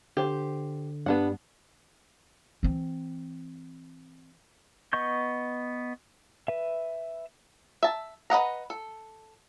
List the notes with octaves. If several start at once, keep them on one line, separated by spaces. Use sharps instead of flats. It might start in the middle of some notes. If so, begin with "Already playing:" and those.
D3 G4 C5
G2 G3 B3 D4 F#5
E3 C4
B3 D#5 C#6 G6
B4 E5
E5 A5
B4 D#5 F#5 A#5
A4